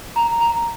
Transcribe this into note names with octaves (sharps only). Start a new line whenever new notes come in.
A#5
A#5